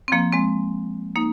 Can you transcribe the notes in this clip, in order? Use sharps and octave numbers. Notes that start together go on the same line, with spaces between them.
C4
F3 A#3
G#3 C4
A#3 D#4